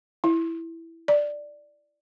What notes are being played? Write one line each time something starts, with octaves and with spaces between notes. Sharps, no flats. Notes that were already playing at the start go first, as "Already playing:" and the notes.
E4
D5